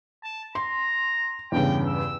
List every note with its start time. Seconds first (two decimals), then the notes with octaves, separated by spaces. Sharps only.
0.24 A5
0.55 A#5 C6
1.52 E2 G2 C#3 G5
1.86 E6